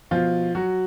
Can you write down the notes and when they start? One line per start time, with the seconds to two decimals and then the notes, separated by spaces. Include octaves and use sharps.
0.11 B2 F3 F4
0.55 F#3 F#4